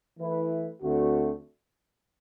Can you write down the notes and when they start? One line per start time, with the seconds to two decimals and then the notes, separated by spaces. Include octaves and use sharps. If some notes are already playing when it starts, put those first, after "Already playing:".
0.19 E3 A3 E4 B4
0.81 D2 D3 A3 C4 F#4